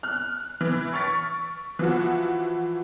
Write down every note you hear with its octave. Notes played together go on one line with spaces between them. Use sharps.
F6 F#6
E3
C#6 F6 A6 B6 D7
E3 F3 F#4